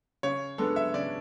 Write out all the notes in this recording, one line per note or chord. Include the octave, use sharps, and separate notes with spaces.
C#3 C#5
G#3 B3 D4 A4
E5
C#3 D5